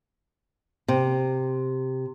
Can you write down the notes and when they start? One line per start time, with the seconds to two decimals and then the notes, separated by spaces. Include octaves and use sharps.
0.88 C3